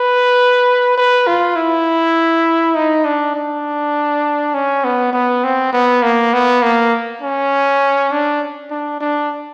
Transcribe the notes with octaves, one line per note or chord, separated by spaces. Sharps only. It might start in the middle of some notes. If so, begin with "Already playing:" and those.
Already playing: B4
B4
F4
E4
D#4
D4
D4
C#4
B3
B3
C4
B3
A#3
B3
A#3
C#4
D4
D4
D4